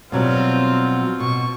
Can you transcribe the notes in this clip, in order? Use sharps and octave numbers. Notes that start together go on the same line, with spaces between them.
B2 F#3 G3 C4 F4
B2 C#6